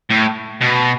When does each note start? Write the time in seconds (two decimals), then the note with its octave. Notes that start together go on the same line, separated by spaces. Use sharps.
0.10 A2
0.61 B2